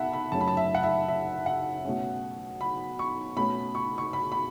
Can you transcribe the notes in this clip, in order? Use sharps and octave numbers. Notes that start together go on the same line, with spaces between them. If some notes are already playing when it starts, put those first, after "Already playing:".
Already playing: B2 E5 F#5 A5 B5
B5
F#2 C#3 F#3 A3 C#4 A5
B5
A5
E5
F#5
E5
E5
F#5
B2 A3 C#4
B5
C#6
B2 A3 C#4 B5
C#6
C#6
B5
B5